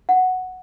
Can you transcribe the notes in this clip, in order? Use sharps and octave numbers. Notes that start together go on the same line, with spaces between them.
F#5